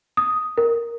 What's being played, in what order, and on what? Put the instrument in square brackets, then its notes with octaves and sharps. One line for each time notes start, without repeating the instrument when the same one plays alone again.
[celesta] D#6
A#4